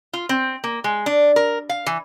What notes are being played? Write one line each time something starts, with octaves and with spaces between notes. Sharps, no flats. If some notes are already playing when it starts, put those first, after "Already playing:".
F4
C4
A#3
G#3
D4
A#4
F5
E3